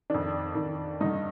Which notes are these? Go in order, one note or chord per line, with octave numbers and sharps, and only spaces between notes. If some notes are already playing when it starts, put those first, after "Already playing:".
F2 D#3 D4
F2 D#3
G2 D3 D#4